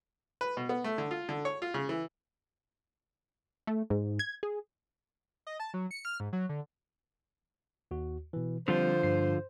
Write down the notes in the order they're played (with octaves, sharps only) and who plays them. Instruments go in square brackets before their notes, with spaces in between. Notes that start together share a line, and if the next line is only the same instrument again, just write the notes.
[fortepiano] B4
B2
B3
A3
D3
F4
D3
C#5
F4
C#3
E3
[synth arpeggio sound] A3
G#2
G#6
G#4
[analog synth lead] D#5
A5
F#3
C#7
F6
G#2
F#3
D3
[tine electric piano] D#2 F#4
B2 E3
[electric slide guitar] D3 F3 F4 [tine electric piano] G3 C4 [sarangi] C5
[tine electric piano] G2 C7